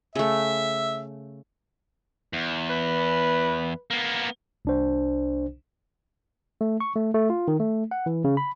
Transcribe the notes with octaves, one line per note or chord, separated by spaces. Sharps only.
C#3 A3 E5
E2
B4
A#3 B3
C2 D4 C5
A3
C#6
A3
A3
F4
D#3
A3
F#5
E3
C#3
B5